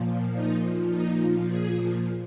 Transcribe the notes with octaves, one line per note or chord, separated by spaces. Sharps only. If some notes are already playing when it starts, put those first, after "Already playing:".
Already playing: A#2 F3
D#4
D#4
G#4